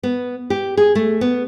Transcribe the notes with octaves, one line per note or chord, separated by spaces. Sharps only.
B3
G4
G#4
A3
B3